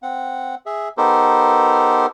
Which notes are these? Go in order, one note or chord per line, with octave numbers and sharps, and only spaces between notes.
C4 F#5
G#4 E5
B3 D#4 G4 A4 A#4 C5